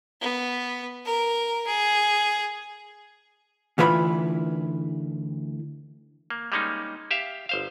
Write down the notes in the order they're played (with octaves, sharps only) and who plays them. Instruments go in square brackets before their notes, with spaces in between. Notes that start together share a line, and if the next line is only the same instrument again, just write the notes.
[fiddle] B3
A#4
G#4
[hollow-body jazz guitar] D2 E3 F4 D5 B5
[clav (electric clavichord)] A#3
G3 G#3 A#3 C#4 D#4
G4 E5 F5
G1 C5 F5